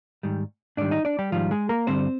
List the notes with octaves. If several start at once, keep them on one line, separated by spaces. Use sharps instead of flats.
G#2 D#3 G3
G#2 D#3 G3 D4 D5
D#4 D#5
D4 D5
G3 G4
G#2 D#3 F3 G3 F4
G#3 G#4
A#3 A#4
G2 D3 G3 C4 C5